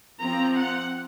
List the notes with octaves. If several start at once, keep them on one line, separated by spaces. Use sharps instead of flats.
F3 C4 A#5
F#5